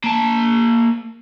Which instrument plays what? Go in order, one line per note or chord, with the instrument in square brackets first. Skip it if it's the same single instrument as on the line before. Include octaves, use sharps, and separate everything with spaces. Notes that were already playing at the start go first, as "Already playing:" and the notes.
[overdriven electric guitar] A#3 A5